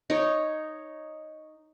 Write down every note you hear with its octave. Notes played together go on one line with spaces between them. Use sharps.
D#4 C#5